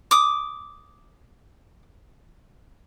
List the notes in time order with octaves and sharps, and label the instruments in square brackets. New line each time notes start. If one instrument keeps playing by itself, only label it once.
[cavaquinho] D6 D#6